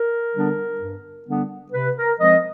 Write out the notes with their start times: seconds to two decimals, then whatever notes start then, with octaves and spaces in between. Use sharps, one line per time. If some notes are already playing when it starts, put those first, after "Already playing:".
Already playing: A#4
0.33 D3 G3 B3 D4
0.80 G2
1.26 D3 G3 B3 D4
1.73 C3 B4
1.96 A#4
2.19 F3 G#3 C4 D#5